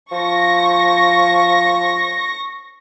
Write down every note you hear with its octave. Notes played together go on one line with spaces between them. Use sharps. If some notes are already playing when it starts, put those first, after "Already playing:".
F3 C#6 A#6